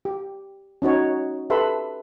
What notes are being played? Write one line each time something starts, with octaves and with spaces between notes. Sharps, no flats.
G4
C#4 D#4 F#4 C#5
G4 A4 B4 E5 B5 C6